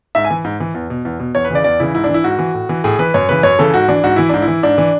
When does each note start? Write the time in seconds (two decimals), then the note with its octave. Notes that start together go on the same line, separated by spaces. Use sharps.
0.15 G#2 E5
0.25 G#5
0.30 E3
0.44 G#2
0.60 E3
0.74 E2
0.90 B2
1.05 E2
1.19 B2
1.35 E2 C#5
1.45 B4
1.50 C#3 E3 D5
1.64 E2 D5
1.80 C#3 E3 E4
1.94 G#2 E4
2.04 D4
2.09 E3
2.14 E4
2.24 G#2 F#4
2.39 E3
2.54 A2
2.69 E3
2.84 A2 G#4
2.99 E3 B4
3.14 F#2 C#5
3.29 C#3 E3 B4
3.43 F#2 C#5
3.59 C#3 E3 A4
3.74 G#2 F#4
3.88 E3 D4
4.04 G#2 F#4
4.16 E3 E4
4.29 G#2 D4
4.42 E4
4.48 E3
4.63 G#2 D4
4.78 E3